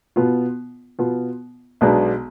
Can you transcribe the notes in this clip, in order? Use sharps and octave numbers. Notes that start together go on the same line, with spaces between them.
B2 B3 F4
B2 B3 F4
B1 B2 G#3 B3 D4